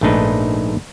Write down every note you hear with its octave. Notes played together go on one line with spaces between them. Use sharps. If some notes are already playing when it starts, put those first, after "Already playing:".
A#1 G#2 A3 D4 D#4 B4